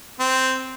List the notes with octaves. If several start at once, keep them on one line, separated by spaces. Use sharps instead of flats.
C4